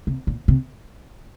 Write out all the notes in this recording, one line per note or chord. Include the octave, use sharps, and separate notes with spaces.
C3
A#2
C3